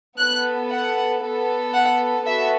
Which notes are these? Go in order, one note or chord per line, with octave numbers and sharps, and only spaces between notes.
B3 A4 F#6
F#5
B3 A4
F#5
B3 F#4 A4 E5